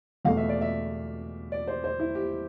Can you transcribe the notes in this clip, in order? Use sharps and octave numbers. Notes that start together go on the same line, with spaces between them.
E2 B2 A3 F5
E5
D5
E5
D5
C5
C5
E4
G4